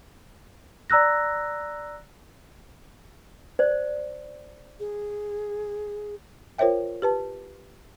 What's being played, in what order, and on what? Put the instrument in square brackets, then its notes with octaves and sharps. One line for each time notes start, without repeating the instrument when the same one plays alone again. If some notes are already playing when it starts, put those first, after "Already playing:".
[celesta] D5 A#5 E6 F#6 A#6
[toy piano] C5 D5
[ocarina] G#4
[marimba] F4 A#4 C5 C#5 E5 G5
G4 B4 A5